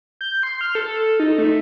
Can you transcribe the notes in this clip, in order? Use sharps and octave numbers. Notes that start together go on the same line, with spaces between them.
G6
C6
F6
A4
D#4
A3